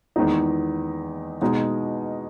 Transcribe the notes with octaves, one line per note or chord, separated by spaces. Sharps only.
E2 D#3 G#3 D#4
B2 G#3 D#4